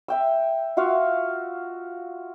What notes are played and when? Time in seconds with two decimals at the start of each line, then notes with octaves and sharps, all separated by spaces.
0.08 E5 G5 E6
0.77 F4 F#4 E5 F5